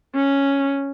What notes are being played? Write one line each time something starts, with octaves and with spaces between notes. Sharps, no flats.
C#4